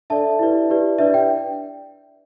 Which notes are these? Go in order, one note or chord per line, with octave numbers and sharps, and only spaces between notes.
D4 A4 D5 E5 A5
E4 G4 B4 D5
E4 G4 B4 D5
D4 B4 D5 E5
G5